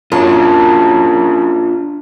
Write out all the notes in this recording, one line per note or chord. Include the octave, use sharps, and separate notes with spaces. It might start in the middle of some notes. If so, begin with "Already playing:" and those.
F#2 D4 F4 C#5 A5